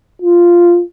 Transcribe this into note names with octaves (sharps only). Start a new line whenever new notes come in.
F4